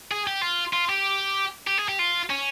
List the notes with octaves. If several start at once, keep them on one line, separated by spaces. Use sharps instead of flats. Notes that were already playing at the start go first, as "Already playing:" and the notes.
G#4
G4
F4
F4
G4
G4
G#4
G4
F4
C#4